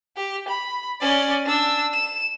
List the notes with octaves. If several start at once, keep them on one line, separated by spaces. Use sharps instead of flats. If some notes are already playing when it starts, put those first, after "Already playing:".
G4
B5
C#4 D5
D4 E6
E7